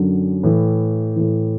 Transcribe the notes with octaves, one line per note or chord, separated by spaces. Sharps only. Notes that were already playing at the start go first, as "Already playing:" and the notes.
Already playing: F#2 D3 F#3
A2 E3
A2 E3